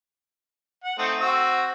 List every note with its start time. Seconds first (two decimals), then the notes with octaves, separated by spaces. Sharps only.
0.84 F#5
0.98 A3 C4 D#4
1.21 C4 F#4 E6